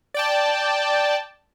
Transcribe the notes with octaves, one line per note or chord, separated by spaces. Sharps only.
D5 G5 A5